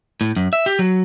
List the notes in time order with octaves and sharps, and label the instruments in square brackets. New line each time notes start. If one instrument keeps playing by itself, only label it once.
[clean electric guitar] A2
F#2
E5
G4
F#3